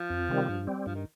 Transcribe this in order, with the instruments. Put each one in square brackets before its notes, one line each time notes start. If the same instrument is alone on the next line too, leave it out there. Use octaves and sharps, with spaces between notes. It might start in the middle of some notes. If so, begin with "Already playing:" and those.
Already playing: [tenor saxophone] F3
[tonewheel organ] F2
C3 D#3 G3 C4
G2
G3 C4
[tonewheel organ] G2 [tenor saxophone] F3
[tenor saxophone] D#3